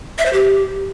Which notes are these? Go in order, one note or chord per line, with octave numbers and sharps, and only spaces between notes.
E5
C5
G4